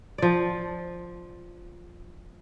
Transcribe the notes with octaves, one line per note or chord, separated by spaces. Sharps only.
F3 D5